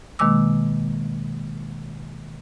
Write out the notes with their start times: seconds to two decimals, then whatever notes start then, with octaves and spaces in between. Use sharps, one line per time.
0.19 B2 D#3 G#3 A#3 D6 E6